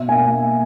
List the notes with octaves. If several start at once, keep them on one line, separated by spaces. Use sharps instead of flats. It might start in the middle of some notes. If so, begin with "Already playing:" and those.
Already playing: B2 E5
A#3 G#5